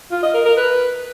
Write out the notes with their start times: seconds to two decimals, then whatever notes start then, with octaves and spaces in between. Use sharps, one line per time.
0.11 F4
0.23 D#5
0.34 A#4
0.45 A#4
0.57 B4